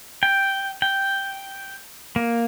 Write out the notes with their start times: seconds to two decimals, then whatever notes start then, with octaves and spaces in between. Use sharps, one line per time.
0.23 G5
0.82 G5
2.16 A#3